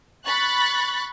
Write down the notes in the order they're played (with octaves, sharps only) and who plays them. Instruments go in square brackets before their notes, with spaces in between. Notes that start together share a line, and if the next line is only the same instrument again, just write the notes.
[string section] B5 C#6 F#6 A6